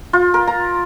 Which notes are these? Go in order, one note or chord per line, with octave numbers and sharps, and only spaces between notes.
F4
A#4
A#5